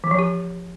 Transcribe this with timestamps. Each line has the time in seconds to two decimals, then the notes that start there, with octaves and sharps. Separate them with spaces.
0.04 E3
0.11 F3
0.19 G4